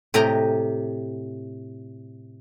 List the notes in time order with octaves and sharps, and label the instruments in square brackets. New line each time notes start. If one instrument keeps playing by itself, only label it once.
[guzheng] A2 C3 G4 D#5 G#5 A#5